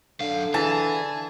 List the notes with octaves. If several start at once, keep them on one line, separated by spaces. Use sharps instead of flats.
F#2 D3 F5
E3 G#4 A5